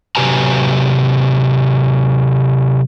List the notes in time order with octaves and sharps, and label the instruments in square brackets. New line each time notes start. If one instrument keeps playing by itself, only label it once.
[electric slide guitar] C3 F#3 G4 B4 G#5 A#5